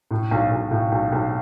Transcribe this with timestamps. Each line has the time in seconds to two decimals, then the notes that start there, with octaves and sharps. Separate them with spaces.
0.11 A2
0.31 B1
0.51 B1
0.71 A2
0.92 B1
1.12 B1